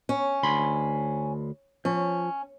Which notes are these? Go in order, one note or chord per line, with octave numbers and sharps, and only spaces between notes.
C#4
D2 B5 C6
F3 C#4